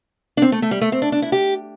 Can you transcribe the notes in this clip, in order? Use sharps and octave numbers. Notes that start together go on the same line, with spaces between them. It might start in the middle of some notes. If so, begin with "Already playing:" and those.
D4
C4
A3
A3
G3
A3
C4
D4
D4
E4
G4